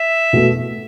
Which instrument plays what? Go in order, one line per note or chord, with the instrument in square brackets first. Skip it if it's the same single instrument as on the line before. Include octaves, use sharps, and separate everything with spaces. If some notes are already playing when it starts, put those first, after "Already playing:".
Already playing: [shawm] E5
[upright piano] B2 A3